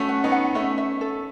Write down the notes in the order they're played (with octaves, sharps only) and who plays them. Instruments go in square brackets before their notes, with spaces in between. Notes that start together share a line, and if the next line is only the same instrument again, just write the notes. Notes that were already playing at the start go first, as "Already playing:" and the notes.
Already playing: [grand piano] A3 C#4 F#4 A4
[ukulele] F#5
[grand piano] B3 D#4
[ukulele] F#5
[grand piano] A3 C#4 [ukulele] E5
[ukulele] E5
A4